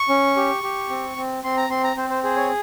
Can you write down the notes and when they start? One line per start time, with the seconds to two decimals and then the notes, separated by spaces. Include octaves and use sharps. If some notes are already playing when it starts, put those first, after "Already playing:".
Already playing: C#6
0.09 C#4
0.36 G4
0.63 G4
0.90 C4
1.17 C4
1.44 C4 C6
1.57 A#5
1.70 C4 C6
1.83 A#5
1.96 C4 C5
2.10 C5
2.24 G#4 C5
2.37 C#5